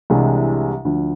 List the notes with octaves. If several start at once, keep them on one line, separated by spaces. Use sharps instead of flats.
C2 C3 E3 G#3 D4
D2 D3 F3